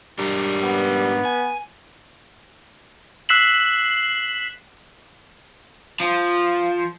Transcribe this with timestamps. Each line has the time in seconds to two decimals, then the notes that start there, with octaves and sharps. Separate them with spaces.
0.19 G#2 G3 D4 A#4
0.63 B3
1.25 G#5
3.29 E6 F#6 B6 C7 E7 F#7
6.00 F3